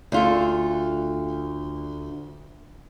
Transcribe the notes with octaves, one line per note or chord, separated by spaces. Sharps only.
D2 F4 A4